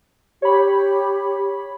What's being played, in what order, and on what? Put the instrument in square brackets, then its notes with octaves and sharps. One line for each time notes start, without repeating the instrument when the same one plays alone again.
[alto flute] G4 [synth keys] C#5 B5